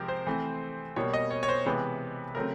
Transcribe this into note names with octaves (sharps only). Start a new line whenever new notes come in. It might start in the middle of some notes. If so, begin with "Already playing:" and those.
Already playing: C3 F3 G#3 C4 G4 A#4
C5
E3 A3 C4
B2 G3 A#3 C#5
D#5
C#5
C#5
C5
C3 E3 G#3 B3 B4
C#3 F#3 A3 C4 A#4